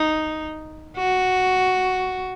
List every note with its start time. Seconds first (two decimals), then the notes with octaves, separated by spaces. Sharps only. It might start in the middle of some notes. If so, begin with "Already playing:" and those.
Already playing: D#4
0.97 F#4